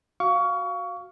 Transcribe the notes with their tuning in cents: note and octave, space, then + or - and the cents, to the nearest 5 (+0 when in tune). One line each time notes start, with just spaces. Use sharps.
F#4 +0 F5 +0 C#6 +25